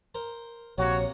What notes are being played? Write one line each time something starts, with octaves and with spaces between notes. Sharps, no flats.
A#4 C5
A#1 C3 A#3 F#4 C#5